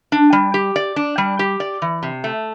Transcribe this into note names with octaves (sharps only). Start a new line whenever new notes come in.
D4
G3
G4
D5
D4
G3
G4
D5
E3
C3
A3